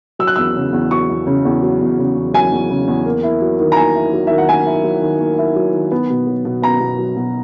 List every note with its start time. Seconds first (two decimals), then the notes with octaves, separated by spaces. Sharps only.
0.19 F#3 E6
0.27 F#6
0.36 E2 E6
0.56 C#3
0.73 E2
0.91 F#3 C#6
1.10 E2
1.27 C#3
1.45 E2
1.63 F#3
1.81 E2
1.98 C#3
2.16 E2
2.34 F#3 G#5
2.52 E2
2.70 C#3
2.88 E2
3.05 A#3
3.23 E4
3.41 F#3
3.60 D#3
3.72 A#5
3.76 A#3 G#5
3.95 E4
4.13 F#3
4.27 D#3 E5
4.38 F#5
4.49 A#3 G#5
4.66 E4
4.84 F#3
5.02 D#3
5.20 A#3
5.38 E4
5.56 F#3
5.73 D#3
5.92 B3
6.10 B2
6.27 F#3
6.45 B2
6.62 B3 A#5
6.80 B2
6.98 F#3
7.16 B2